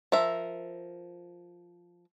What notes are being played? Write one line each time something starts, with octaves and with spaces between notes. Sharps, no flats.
F3 A#4 E5